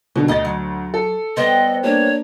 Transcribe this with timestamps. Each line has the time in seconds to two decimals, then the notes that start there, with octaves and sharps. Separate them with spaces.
0.16 B2 D3 D#3 F#3
0.28 D2 D#4 D#5 A6
0.45 F#3
0.94 A4
1.37 G3 B3 C5 D#5
1.83 A#3 D4 C#5